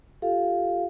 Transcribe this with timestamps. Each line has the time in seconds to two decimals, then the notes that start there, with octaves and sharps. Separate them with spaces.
0.22 F4 G4 A4 F5